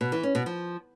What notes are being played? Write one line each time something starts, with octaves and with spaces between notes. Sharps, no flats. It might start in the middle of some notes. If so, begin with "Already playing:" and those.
B2
E3
C#4
B2
F3